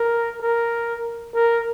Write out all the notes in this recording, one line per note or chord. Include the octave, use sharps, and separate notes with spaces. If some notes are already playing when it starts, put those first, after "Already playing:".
Already playing: A#4
A#4
A#4